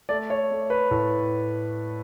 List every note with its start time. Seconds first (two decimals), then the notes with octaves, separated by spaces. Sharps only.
0.09 A3 D5
0.30 C#5
0.51 A3
0.70 B4
0.91 A2